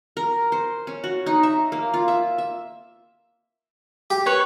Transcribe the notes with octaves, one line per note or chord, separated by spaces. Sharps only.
A#4
C5
C#4
F#4
D#4
E5
A#3
F4
E5
E5
G4
B4 C#5